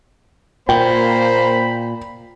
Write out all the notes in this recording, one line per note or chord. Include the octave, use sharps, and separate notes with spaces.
A#2 A#3 C5 G5 B5